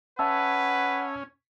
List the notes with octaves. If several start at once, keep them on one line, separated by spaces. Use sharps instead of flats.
C#4 B4 E5 F#5 A5 E6